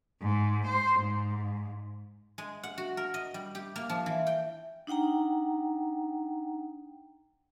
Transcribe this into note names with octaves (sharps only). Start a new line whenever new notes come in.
G#2
C5
G#2
G#3
F#5
F#4
A#4
D#5
G3
G4
A#3
F3
E3
G5
D4 D#4 F#5 G5 A#5